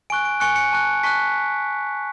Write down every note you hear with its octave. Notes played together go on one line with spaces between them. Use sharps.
G#5 C#6 F#6 D7
D7
G#5 C#6 F#6 C#7
C#7
A5 C#6 F#6
A5 C#6 F#6 B6